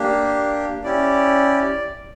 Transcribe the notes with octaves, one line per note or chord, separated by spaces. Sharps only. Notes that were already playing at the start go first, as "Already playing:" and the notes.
Already playing: A#3 D4 G4
C#4 E4 G4 D5